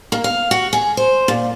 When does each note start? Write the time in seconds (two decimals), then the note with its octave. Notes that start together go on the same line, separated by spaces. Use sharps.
0.12 A#3
0.24 F5
0.51 F#4
0.73 G#4
0.97 C5
1.28 A#2